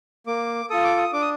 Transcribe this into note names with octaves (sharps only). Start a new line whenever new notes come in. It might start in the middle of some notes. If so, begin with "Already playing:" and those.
A#3 D6
F4 A4 D#6
D6
D#6
D4 D6
D#6